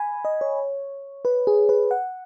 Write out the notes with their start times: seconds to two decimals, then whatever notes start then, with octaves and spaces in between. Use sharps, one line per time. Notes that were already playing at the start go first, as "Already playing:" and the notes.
Already playing: G#5 B5
0.25 D#5
0.41 C#5
1.25 B4
1.47 G#4
1.69 B4
1.91 F#5